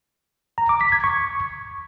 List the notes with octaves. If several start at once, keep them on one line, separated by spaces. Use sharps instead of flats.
A#5
D6
B6
G#6
C#6